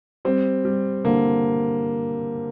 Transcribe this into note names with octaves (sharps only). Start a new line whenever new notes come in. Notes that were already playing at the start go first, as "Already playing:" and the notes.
G3 C4
G3
D3 A#3